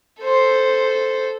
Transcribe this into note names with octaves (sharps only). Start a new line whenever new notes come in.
A4 C5